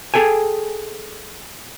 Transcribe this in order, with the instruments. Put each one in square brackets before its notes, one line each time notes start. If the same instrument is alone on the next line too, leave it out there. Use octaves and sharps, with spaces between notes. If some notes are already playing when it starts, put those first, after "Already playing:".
[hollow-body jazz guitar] G#4 A4 G5 G#5